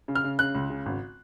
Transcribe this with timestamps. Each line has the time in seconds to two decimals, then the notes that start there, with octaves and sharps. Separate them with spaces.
0.08 C#3
0.15 F6
0.24 C#3
0.39 C#3 F#6
0.55 C#2
0.70 C#3
0.86 G#1